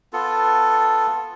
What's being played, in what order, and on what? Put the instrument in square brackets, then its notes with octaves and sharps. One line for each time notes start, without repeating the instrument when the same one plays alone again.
[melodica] B3 F4 A4